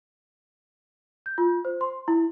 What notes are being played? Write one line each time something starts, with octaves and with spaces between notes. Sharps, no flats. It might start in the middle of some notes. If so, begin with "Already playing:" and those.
G6
F4
C5
C6
E4